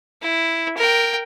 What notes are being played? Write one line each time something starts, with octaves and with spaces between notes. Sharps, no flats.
E4
A#4 G5